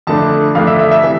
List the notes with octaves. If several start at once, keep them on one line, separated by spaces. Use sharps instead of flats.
F2 D3 A3 D4 A5
F2 D3 A3 D4 F5
E5
E5
E5
C3 E3